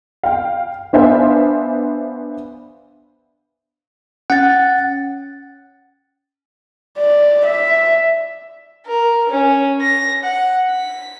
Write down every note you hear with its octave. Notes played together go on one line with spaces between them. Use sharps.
F5 G5
B3 D4 C5 E5 F5 G#5
C#4 F#5 A6
D5
E5
A#4
C#4
A#6
F#5
B6